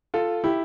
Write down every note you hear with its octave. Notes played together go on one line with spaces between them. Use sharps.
F4 A4
E4 G4